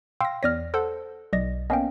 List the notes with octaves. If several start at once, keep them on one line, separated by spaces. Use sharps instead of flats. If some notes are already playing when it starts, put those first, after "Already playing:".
F5 G5 C6 E6 A#6
E2 C#5 D5 F6 A#6
A4 C5 F#5
B1 D5 D#5 A#6
A#3 B3 C#4 D#5 F5 G5